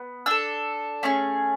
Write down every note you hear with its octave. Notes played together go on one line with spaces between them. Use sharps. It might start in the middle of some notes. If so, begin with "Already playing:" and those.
Already playing: B3
D4 A4 E6
A3 C#4 G#4